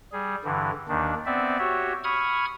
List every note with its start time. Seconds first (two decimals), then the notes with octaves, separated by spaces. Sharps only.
0.12 G3 G#4
0.44 G2 D3 E3
0.88 D#2 D#3 D4
1.26 B3 C4 D5 E5
1.59 F#4 G4 C#5 E5
2.04 B5 C#6 D#6 F6 G#6